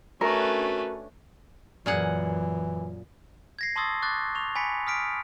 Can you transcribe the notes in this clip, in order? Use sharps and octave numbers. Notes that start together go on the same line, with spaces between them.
A3 C#4 D4 F#4 A#4 B4
F#2 A#2 E3 G#4 F#5
G#6 A#6 C7
A5 C6 C#6 D#6 E6 A6
C#6 D6 F#6 G6 A6
C#6 F7
G#5 B5 B6 C#7
D#6 F6 B6 D7